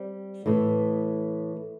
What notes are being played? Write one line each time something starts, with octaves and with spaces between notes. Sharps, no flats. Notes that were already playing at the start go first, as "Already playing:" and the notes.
Already playing: G3 C4
A2 E3 A3